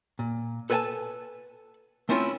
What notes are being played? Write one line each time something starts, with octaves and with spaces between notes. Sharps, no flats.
A#2
A4 B4 C#5 F#5 G#5 A5
A3 C4 C#4 E4 F4